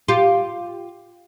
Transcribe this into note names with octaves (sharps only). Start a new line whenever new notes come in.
F4 G4